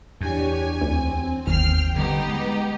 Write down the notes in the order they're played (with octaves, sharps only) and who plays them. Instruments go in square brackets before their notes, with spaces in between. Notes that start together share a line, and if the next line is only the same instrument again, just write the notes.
[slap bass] E2 [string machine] D4 G4 C#5 [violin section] G#5
[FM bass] D2 [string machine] C4
[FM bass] G1 [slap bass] D#2 [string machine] G5 [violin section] F6 C7
[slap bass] D3 G3 [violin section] B3 D#4 G4
[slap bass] G#3